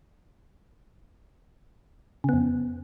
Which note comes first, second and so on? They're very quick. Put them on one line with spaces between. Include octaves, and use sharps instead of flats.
C#3 B3 F2